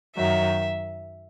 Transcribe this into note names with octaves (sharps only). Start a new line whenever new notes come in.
F#2 D#3 F#3 E5